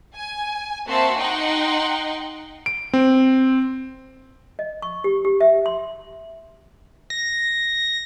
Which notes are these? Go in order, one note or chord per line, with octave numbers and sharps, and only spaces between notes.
G#5
A#3 C4 F#4 E5 A5 C6
D#4 F#5 G5 C6
D7
C4
D#5
C#6
G4
G4
E5
C6
A#6